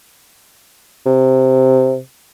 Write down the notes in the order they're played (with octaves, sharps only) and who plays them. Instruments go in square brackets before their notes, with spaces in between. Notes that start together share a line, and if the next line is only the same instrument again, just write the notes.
[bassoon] C3